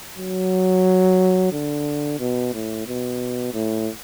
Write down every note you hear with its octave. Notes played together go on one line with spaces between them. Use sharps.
F#3
D3
B2
A2
B2
A2